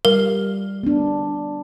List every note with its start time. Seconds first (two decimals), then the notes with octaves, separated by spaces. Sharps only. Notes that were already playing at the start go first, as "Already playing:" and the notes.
0.05 G3 A#4 F5
0.83 B3 D4